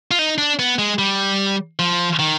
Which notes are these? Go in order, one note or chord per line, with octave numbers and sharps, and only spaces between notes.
F4
D#4
D4
B3
G#3
G3
F3
D#3